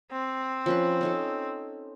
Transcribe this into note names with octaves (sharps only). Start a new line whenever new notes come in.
C4
F3 C#4 B4
C#4 D#4 A4